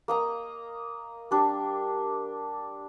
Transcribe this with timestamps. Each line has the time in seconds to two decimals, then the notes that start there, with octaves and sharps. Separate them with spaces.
0.08 A#3 D#5 A#5
1.31 G3 D4